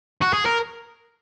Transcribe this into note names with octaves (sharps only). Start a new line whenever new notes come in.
F#4
G#4
A#4